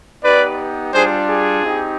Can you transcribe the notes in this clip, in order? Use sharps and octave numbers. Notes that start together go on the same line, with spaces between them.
B3 D#4 G4 B4 D5
G3 D4 F4 G#4 C5
G#4
C4 D#4 G4